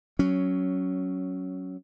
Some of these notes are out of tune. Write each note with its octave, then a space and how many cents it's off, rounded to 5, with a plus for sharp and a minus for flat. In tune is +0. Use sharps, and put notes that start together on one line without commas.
F#3 +10 C#4 +0